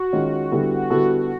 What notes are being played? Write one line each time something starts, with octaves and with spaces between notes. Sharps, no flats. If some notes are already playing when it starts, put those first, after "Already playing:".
Already playing: F#4
D#3 G#3 C#4 F4
D3 G3 B3 E4 A4
D3 G3 B3 E4 F#4 A4